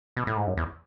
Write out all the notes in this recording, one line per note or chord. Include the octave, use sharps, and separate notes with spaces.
B2
A2
G#2
F#2
E2